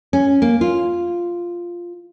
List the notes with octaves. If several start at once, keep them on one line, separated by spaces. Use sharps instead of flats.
C#4
A#3
F4